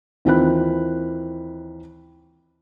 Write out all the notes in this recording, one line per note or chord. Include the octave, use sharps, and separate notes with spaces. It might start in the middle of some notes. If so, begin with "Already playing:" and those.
D#2 E3 C4 F4 B5 F#6